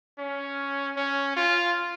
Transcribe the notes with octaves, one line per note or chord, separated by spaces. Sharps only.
C#4
C#4
F4